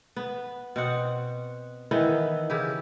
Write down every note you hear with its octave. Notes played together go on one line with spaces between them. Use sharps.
B3
B2 C4 F#5
D#3 E3 B3 E4
C#3 E4 G4